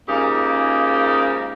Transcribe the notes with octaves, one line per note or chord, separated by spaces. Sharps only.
G#2 C#3 A#3 D#4 F4 G4